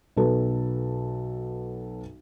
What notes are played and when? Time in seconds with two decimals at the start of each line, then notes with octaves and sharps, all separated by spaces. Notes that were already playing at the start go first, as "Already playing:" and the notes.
0.16 B1 F#3 B3 A4 B4